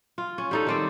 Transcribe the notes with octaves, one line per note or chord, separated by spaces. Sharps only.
F4
C#4
G3 D#4 A4
D#3 C4 D5